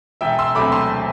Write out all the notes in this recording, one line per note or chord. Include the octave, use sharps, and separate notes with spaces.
E1 E5 G5
C6 E6
D2 C3 F#3 A3 B5 D6
A5 C6